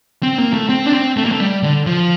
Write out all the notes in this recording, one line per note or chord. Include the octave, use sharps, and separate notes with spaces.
C4
A#3
A3
C4
D4
C4
A3
A#3
A3
G3
D3
F3